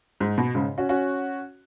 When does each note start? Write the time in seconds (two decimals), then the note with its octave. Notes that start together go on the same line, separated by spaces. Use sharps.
0.20 G#2
0.38 B2
0.55 G#2 C#3
0.78 C#4 F#4
0.89 C#4 F#4